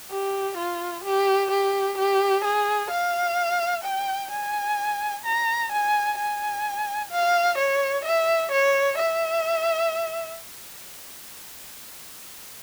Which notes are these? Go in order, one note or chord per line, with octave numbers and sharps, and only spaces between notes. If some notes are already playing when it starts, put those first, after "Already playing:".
G4
F4
G4
G4
G4
G#4
F5
G5
G#5
A#5
G#5
G#5
F5
C#5
E5
C#5
E5